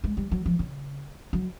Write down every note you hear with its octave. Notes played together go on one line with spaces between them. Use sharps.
G#3
G3
F#3
F3
C#3
F#3